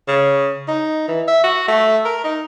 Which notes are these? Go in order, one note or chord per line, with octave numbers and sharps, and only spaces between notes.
C#3
D#4
E3
E5
F#4
A3
A#4
D#4